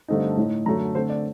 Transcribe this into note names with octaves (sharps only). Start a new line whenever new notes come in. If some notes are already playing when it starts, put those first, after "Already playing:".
G2 D3 A3 C4 D#4
A2 A3 D#4
F#2 D3 F#3 A3 A#5
D3 A3 C4 C5
D5